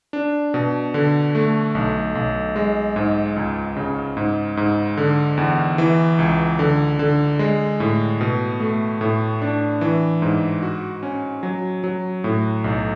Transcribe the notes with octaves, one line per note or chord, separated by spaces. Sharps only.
D4
B2
D3
A3
B1
B1
G#3
G#2
C#2
C#3
G#2
G#2
D3
E2
E3
C#2
D3
D3
G#3
A2
B2
A3
A2
D4
E3
G#2
F#4
C#4
F#3
F#3
A2
B1